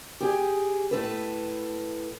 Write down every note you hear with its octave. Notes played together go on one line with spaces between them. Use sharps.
G4 G#4
A2 A4 B4